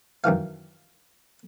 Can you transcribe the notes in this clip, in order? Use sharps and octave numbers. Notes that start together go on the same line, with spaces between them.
F#2 D#3 E3 F5